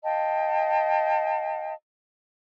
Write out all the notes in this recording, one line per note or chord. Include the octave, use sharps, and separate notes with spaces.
D#5 F5 G5 A5